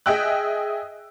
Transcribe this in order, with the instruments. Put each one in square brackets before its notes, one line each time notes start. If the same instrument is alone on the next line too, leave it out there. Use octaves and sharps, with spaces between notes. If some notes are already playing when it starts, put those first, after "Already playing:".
[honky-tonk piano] G#4 D#5 E5 G5 E6 F#6